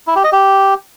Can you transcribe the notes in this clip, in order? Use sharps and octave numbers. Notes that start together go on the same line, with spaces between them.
E4
G4
D#5
G4